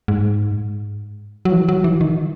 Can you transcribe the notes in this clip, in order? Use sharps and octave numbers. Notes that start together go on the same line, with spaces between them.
G#2
F#3
E3
F#3
E3
D#3